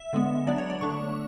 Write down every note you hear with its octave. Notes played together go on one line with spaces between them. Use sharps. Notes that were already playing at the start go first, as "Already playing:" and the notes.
Already playing: E5
D3 G#3 B3
F#3 B3 D4 D5
C#5
D5
D3 A3 D4 C#6